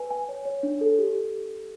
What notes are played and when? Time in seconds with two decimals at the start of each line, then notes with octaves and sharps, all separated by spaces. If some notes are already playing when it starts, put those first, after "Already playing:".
Already playing: B4 G#5
0.11 G#5
0.29 C#5
0.45 C#5
0.63 D4
0.81 A4
0.99 G4